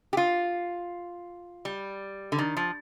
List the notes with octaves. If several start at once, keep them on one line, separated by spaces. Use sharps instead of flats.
G4
F4
G3
D3
D#3
F3